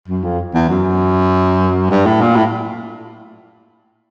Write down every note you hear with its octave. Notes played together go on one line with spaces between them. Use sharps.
F#2
F2
E2
F#2
G2
A2
A#2
A2